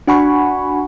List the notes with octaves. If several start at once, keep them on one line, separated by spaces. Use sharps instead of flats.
D4 F#4 F#5 G#5 B5 C#6